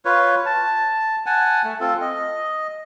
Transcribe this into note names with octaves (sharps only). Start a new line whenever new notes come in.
F4 B4 C#5
A5
F#5 G#5 A5
A3
C4 F4 A4
D#5